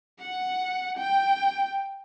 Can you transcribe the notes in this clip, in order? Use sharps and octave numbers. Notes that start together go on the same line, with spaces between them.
F#5
G5